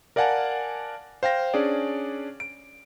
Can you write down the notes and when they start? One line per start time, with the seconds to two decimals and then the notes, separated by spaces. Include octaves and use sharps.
0.16 A#4 D5 F5 F#5 G#5 A5
1.23 C5 F5 G5 A#6
1.54 C#4 D4 G#4 D5
2.40 D7